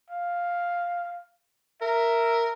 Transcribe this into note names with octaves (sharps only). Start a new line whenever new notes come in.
F5
A#4 E5